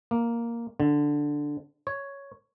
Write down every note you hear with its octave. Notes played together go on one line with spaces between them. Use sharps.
A#3
D3
C#5